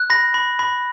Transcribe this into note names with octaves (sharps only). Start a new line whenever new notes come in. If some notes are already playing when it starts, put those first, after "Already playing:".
Already playing: F#6
B5 A#6
B5
B5